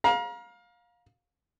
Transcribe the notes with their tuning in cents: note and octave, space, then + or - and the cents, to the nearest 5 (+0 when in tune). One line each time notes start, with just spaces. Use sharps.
F5 +20 A#5 +35